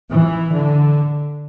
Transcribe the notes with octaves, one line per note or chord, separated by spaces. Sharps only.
E3
D3